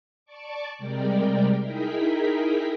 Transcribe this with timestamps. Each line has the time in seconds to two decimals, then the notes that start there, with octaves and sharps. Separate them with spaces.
0.25 D5 A5 C#6 D6
0.78 C3 G3 G#3 A#4 D5 G5
1.60 D#4 E4 G#4 A#4 G5 B6